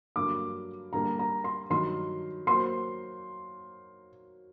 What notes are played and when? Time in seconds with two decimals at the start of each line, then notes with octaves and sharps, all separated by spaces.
0.16 G2 D3 F#3 A#3 D6
0.93 D3 G3 A#3 A#5
1.19 A#5
1.44 C6
1.70 G2 D#3 F#3 C6
2.47 F#3 A#3 F#4 C5 C6